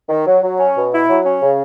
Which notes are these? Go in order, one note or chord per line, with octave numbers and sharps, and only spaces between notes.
D#3
F#3
F#3
C#4
B2
E4
F#3
C#4
C#3